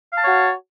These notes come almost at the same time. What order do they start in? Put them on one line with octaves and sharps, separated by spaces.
F5 A5 C#5 F#4